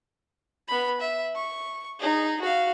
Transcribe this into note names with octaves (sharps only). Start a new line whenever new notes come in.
B3 B5
E5
C#6
D#4 G#4
F#4 F5